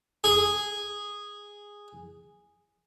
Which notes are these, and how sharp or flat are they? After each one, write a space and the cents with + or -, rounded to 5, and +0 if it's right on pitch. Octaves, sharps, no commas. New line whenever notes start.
G#4 -10